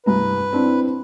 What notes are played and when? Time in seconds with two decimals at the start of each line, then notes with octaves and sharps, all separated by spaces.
0.06 C2 G2 B4 A#5
0.53 C4 D4 E4